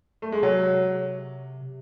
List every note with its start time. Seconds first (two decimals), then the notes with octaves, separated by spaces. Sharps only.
0.22 A3
0.32 G#3
0.43 C3 F#3